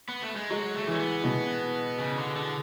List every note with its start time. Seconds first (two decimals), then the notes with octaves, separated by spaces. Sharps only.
0.09 B3
0.22 A3
0.36 G#3
0.50 F#3 G#3
0.75 A3
0.87 E3 C#4
0.99 B3
1.24 B2
1.99 C#3
2.18 D3
2.36 D3